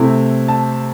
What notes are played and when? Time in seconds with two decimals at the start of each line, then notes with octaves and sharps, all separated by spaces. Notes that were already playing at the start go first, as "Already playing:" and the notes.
Already playing: C3 A3 C4 E4
0.48 A5